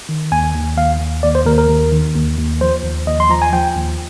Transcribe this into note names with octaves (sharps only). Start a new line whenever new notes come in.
D#3
D#2 G#5
D#2
D#2 F5
D#2
D#2 D5
C5
D#2 A#4
A#4
D#2
D#3
D#2
D#2
F3 C5
D#2
D#2 D#5
C6
F3 A#5
G#5
F3 G5
D#2